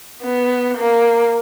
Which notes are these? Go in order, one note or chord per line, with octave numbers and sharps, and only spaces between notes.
B3
A#3